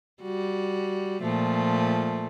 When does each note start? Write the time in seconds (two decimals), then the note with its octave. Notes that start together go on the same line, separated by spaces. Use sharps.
0.23 G3 F#4
1.22 A#2 F3 A3